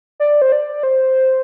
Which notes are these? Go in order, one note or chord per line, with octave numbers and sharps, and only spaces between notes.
D5
C5
D5
C5